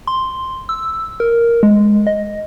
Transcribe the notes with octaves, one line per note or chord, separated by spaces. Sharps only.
C6
E6
A#4
G#3
D#5